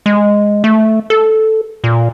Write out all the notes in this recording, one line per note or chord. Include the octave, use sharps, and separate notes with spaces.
G#3
A3
A4
A#2